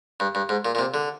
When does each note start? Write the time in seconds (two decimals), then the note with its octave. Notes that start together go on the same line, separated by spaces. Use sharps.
0.20 G2
0.35 G2
0.49 G#2
0.65 A#2
0.75 A#2
0.79 C3
0.94 D3